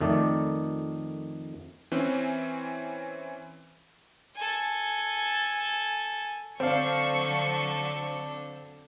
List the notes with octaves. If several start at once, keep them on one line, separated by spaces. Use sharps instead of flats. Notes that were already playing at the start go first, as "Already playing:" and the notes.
F2 D#3 A3 D5
E3 C4 C#4
A4 G#5
D3 F#3 C4 D4 A4 D5 F5 C#6